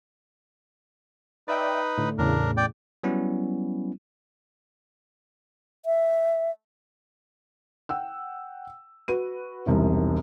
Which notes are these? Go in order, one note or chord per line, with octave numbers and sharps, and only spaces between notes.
D#4 B4 D5 E5 G5
A2 D3
E2 A2 C#3 D4 A#4
D5 G5
F#3 G3 B3 C#4 E4
E5
F#5 G5 E6
F#4 B4 D#7
E1 C2 C3 D#3